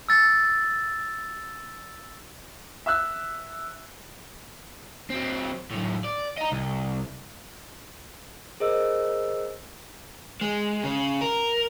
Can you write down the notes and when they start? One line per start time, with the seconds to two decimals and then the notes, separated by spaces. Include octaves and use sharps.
0.09 E6 A6
2.86 E5 E6 F#6
5.10 F#3 C4
5.71 F#2 A2
6.04 D5
6.38 D#5 A#5
6.52 C2
8.60 G#4 A#4 C5 D#5 E6
10.41 G#3
10.84 C#3
11.21 A#4